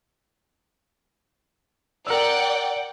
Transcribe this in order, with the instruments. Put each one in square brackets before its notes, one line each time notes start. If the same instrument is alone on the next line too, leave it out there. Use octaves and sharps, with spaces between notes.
[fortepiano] A#4 E6 [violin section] D5 F#5 G5